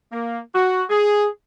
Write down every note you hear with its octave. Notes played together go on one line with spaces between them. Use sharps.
A#3
F#4
G#4